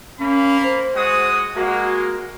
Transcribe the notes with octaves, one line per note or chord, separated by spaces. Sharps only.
A#3 C#4 B5
C5
G#3 F#4 D#6
G#3 A#3 F#4